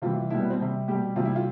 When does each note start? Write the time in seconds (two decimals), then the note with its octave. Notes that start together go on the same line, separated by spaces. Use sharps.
0.02 C3 E3 G3 F4
0.30 B2 G3 E4
0.40 B3
0.50 C4
0.60 C3 G3
0.88 B2 G3 G4
1.16 C3 G3 F4
1.25 E4
1.36 F4